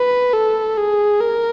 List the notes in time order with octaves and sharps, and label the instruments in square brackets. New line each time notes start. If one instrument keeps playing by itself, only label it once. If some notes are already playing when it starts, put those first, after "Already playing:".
Already playing: [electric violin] B4
A4
G#4
A#4